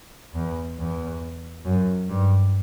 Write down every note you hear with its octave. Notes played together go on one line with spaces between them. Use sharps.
E2
E2
F#2
G2